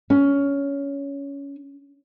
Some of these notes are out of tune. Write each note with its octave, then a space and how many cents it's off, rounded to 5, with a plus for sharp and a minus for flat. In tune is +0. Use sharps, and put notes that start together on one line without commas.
C#4 +15